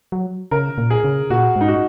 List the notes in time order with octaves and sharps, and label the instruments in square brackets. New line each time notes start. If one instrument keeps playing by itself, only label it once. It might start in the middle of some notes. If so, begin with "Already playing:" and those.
[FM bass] F#3
[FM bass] C#3 [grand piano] A#4
[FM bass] A#2
[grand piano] G#4
[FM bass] C#3
[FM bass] A#2 [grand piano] F#4
[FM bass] G#2 [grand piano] D#4
[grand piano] F#4